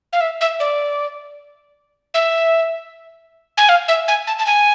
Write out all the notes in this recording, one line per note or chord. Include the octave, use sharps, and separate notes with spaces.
F5
E5
E5
D5
E5
G#5
F5
E5
G#5
A5
A5
G#5